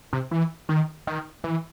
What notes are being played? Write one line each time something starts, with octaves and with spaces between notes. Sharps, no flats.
C3
E3
D#3
D#3
E3